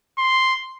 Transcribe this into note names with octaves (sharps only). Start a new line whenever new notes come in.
C6